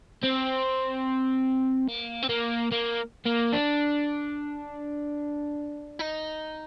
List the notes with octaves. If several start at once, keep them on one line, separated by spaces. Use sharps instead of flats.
C4
A#3
C4
A#3
A#3
A#3
D4
D#4